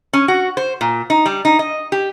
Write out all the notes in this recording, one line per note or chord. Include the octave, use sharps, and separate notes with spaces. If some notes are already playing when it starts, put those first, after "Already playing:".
C#4
F#4
C5
A#2
D#4
G3
D#4
D#5
G4